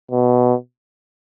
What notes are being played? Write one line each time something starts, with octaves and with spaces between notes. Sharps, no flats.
B2